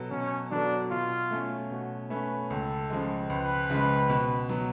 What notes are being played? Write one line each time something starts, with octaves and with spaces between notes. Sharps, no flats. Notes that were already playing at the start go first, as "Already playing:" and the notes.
Already playing: B2 F#3 B3 F#4 A4
B2 C#4
F#3 B3 D4 F#4 A4
B2 F4
A3 C#4
B2 F#4
A3 C#4 B4
C#2 A4
C#3 F3 G#3
C#2 B4
C#3 F3 G#3
B2
F#3 B3